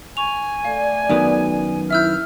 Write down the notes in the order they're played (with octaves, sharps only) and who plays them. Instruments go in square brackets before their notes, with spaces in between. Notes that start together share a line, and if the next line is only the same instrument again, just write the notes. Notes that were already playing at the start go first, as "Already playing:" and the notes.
[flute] G#5 [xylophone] C#6 F7
[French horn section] A3 D5 [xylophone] F5
[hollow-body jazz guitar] F#2 D#3 B3
[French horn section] E4 [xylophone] E5 E6 G6 [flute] F6